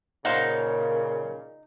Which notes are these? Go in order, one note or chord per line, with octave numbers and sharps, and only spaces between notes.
A#2 C#3 D#4 C5 F5 F#5